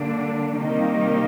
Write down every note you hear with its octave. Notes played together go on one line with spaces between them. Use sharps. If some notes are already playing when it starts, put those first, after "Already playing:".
Already playing: D3 G3 A#3 D4
C3 D#3 G3 A#3 D#4